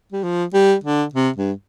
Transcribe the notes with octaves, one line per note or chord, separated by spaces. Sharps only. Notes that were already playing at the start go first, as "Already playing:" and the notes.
G3
F3
G3
D3
C3
G2